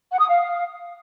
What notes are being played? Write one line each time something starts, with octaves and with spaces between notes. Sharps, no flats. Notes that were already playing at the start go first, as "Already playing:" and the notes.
F#5
D#6
F5